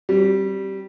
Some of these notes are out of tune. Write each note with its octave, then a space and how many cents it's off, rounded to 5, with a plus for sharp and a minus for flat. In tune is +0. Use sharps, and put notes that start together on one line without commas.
G3 -15 C4 +30